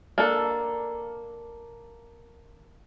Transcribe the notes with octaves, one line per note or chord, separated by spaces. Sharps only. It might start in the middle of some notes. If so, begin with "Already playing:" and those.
A#3 D4 A4